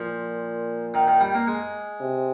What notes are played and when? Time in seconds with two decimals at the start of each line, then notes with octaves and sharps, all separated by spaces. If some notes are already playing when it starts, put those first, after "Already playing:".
Already playing: A#2 F3
0.94 D#3
1.07 D#3
1.20 G3
1.34 A#3
1.47 G#3
2.00 C3